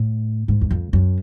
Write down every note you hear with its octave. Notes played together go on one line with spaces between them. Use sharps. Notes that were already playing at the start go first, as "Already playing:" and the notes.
Already playing: A2
G#2
E2
F2
F#2